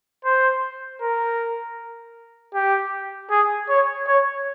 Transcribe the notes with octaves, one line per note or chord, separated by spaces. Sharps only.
C5
A#4
G4
G#4
C#5
C#5